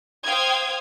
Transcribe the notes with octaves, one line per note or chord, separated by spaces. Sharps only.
C5 F5 G5 D#6 G#6